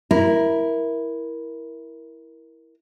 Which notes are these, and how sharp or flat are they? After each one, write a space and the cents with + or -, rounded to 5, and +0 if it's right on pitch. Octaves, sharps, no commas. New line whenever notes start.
E4 -5 A#4 +10